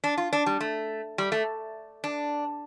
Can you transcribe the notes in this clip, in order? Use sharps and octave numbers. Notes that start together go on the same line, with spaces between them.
D4
F4
D4
G3
A3
G3
A3
D4